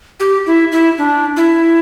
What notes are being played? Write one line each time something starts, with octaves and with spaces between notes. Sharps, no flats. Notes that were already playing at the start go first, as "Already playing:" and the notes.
G4
E4
E4
D4
E4